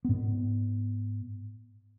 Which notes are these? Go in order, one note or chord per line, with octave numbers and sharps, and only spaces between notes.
G#2 B3